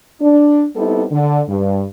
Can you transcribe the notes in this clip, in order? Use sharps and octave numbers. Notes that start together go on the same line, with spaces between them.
D4
G3 B3 C4 D#4 E4 A4
D3
G2